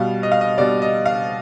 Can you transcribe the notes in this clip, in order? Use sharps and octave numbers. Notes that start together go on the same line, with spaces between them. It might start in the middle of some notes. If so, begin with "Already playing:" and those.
Already playing: B2 G3 F5
D#5
F5
D#5
B2 G3 D5
D#5
F5